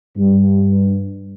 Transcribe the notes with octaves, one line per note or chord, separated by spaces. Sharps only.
G2